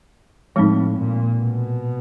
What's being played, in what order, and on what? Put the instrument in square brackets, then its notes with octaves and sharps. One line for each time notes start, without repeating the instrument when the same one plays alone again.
[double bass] A2 [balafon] F3 G#3 C4 D#4
[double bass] A#2
B2